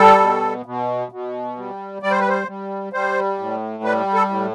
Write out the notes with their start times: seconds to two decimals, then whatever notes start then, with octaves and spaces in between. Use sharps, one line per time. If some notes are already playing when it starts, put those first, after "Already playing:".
Already playing: G3 A4
0.20 B2
0.66 B2
1.12 B2
1.57 G3
2.02 G3 D5
2.11 C5
2.20 B4
2.28 C5
2.47 G3
2.93 G3 C5
3.39 A2
3.83 G3 B4
4.14 A4
4.30 A2